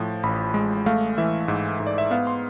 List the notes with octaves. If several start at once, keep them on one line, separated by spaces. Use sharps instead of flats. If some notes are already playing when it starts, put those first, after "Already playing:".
Already playing: A2 F3
A1 B5
G#3
A3 F5
E3 E5
G#2
G#2
D5
E5
B3 F5
C6